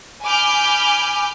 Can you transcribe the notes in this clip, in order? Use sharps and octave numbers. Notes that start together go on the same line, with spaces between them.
G#5 B5 D6 F6 G6